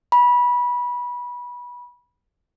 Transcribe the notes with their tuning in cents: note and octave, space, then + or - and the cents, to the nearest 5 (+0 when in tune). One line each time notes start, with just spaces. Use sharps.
B5 -20